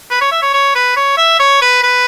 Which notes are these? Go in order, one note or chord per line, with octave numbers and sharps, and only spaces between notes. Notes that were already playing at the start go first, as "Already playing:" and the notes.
B4
C#5
E5
C#5
C#5
B4
C#5
E5
C#5
B4
B4